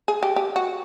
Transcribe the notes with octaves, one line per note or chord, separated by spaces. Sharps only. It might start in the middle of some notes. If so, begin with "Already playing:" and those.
G#4
G4
G4
F#4